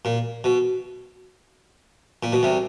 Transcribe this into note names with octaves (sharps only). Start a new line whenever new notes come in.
A#2
B2
A#2
B2
C2 C3